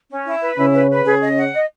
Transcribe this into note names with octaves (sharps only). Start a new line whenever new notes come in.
C#4
E4
B4
C#3 C#4 E4
B4
B4
C#3 C#4 G#4
D#5
F#5
D#5